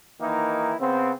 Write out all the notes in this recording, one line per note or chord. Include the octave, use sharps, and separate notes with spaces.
D#3 E3 A#3 D#4 E4
C#3 B3 C4